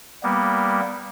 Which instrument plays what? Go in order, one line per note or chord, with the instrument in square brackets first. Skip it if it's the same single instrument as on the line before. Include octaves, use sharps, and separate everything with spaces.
[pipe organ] G3 A#3 B3